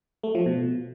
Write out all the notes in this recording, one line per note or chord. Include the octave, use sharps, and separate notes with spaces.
A3
F3
B2